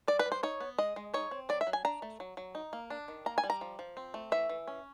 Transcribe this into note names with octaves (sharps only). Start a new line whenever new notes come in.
G3 D5
B4
G3
C5
D#4 C#5
B3
G#3 D#5
G#3
D#4 C#5
C4
F#3 D5
E5
F#3
G#5
D4 A#5
A3
F#3
F#3
D#4
A#3
D4
D#3
A#3 A#5
G#5
G3
A#5
F3
F3
C4
A3
E3 E5
E3
C#4